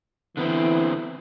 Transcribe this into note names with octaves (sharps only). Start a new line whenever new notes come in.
D3 E3 B3 C4